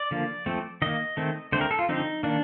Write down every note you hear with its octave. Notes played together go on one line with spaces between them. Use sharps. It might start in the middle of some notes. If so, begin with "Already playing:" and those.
Already playing: D5
D3 F3 A#3
F3 A3 C4
D#3 A#3 D#5
D#3 A3 C4
D3 A3 C4 C5
A#4
A4
F4
D3 F3 C4 D#4
D#3 A#3 D4